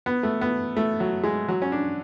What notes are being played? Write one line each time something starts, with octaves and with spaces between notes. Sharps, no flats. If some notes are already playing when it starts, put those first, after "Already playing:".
B3
A3
B3
A3
F#3
G#3
F#3
C#4
D4